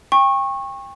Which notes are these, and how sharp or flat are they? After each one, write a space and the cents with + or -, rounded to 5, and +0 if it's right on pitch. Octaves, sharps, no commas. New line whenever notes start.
G5 +30 C#6 -20